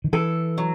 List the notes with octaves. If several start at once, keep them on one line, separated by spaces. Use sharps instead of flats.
D#3
E3 A4
F#3